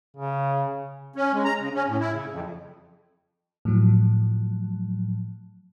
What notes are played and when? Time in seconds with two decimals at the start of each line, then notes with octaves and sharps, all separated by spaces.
0.17 C#3
1.16 C#4
1.32 G#3
1.45 A#5
1.59 C#3
1.74 C#4
1.87 A2
2.00 E4
2.12 C#3
2.31 F2
3.65 A2 F3 F#3